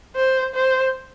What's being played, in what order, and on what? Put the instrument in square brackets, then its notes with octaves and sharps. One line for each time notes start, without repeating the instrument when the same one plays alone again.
[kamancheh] C5
C5